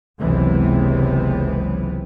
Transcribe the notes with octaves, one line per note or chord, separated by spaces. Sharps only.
F#1 C#2 C3 E3 B3